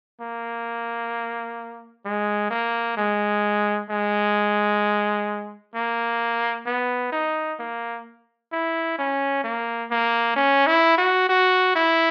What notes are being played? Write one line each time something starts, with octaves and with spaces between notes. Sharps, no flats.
A#3
G#3
A#3
G#3
G#3
A#3
B3
D#4
A#3
E4
C#4
A#3
A#3
C#4
E4
F#4
F#4
E4